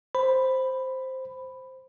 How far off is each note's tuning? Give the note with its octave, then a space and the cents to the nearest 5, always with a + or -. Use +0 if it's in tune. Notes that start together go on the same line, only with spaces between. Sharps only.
C5 +0 B5 +5